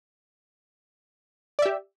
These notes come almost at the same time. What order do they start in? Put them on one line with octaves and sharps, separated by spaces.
D5 E5 G4